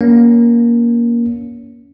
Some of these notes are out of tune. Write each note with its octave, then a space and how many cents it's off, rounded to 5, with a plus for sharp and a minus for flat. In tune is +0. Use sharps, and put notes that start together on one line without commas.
A#3 +15 C#4 +25